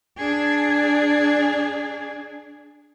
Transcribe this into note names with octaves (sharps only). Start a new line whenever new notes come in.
D4 G#4